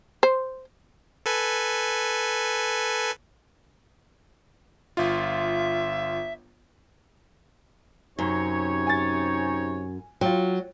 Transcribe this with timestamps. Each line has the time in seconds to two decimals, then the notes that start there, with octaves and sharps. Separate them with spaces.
0.23 C5
1.26 A4 B4 G#5
4.97 G1 F4 E5
8.19 F#2 C3 D#4 C#5
8.87 G#5 A6
10.21 F#3 F4 G5